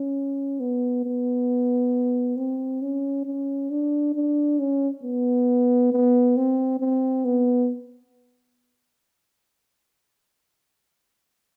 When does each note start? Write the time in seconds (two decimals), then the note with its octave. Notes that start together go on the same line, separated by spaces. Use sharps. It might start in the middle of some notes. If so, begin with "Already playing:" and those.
Already playing: C#4
0.60 B3
1.04 B3
2.37 C4
2.82 C#4
3.26 C#4
3.70 D4
4.15 D4
4.59 C#4
5.03 B3
5.92 B3
6.37 C4
6.80 C4
7.25 B3